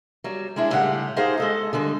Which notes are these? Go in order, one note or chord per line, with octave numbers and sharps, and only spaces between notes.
F#3 G3
G#3 C#4 D4 E4
A2 C#3 G3 G#3 G4 F#5
D#4 G4 G#4 C5 D#5 F5
G#3 A4 D#5
D3 G3 G#3